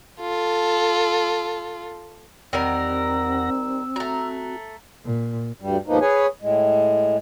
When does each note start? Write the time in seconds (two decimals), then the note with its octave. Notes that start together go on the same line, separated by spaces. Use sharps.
0.20 F4 A4
2.53 E2 D#3 G3 C4 A#4 F#5 E6 A#6
3.96 A3 F#4 A#5
5.06 A#2
5.61 D2 G2 G3
5.87 D#2 G#2 F3 A#3 B3 D#4
6.01 G#4 B4 C#5 G#5
6.42 A2 G#3